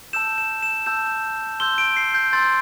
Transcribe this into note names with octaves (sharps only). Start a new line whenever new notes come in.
A5 E6 G6 E7
E7
E7
A5 E6 G6 E7
C6 E6 G6 G7
D7
C7
G6
C6 E6 G6 A6